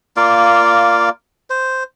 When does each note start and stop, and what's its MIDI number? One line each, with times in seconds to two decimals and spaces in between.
0.17 1.09 58
0.17 1.09 65
0.17 1.09 74
0.17 1.09 77
1.50 1.83 72